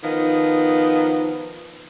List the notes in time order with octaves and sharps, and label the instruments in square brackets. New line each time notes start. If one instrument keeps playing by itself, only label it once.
[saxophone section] D#3 F3 B3